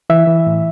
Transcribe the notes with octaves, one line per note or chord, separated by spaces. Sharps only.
E3 E5
E3
A2